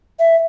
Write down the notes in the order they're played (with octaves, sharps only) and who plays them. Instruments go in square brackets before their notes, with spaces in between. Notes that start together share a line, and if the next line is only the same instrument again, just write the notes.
[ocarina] E5